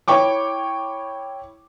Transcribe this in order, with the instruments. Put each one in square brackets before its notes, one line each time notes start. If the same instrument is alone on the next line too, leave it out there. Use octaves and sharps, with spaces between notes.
[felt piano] E4 C#5 G5 C#6 D6